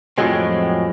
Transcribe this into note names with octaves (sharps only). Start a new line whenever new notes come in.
F2 A2 F3 F#3 G#3 C4